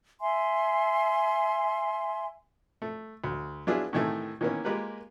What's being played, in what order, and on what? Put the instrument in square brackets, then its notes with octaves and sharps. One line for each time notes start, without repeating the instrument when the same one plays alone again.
[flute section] E5 G#5 C6
[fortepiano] A3
D2
F#3 B3 D4 E4 F4 G#4
A2 C3 D#3 E3 A3
D#3 E3 A#3 B3 C#4
G#3 A#3 F4 G4 A#4 B4